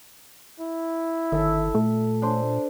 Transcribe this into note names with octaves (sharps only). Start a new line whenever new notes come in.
E4
G1 D#3 A4 E5
A#2 A3
D4 C5